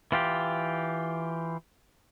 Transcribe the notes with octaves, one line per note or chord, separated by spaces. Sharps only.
E3 F4 G4